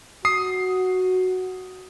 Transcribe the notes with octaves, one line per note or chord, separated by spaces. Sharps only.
F#4 D#6 C7